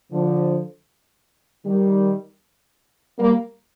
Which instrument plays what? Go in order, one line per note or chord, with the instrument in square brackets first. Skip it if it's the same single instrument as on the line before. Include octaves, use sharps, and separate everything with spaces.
[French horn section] D3 F3
D#3 G3
G3 A#3